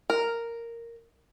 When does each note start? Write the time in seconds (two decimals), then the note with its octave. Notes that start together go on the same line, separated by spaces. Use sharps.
0.10 A#4